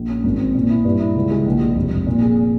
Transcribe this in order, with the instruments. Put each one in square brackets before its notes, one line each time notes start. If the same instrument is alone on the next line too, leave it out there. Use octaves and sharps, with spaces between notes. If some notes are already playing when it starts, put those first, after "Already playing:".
Already playing: [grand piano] A#1
C#4
G#1
C4
A#2
E4
G2
E4
C#2
G#3
A#1
G#3
F1
F1
A#2
G#4